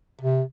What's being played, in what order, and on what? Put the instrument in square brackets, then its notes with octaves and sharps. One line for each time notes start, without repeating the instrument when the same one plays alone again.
[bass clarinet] C3